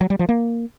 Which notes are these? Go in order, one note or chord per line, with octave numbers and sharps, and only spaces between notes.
F#3
G3
F3
A#3